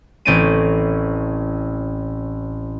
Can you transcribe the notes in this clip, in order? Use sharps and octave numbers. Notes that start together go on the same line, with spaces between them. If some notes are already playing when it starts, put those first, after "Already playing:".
A1 C4 C#4 A6 D7 D#7